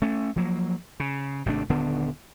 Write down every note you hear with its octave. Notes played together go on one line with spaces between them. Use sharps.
A3 C#4
F3 F#3 A#3
C#3
G#1 C3 A3 D4
D#1 D3 B3 D4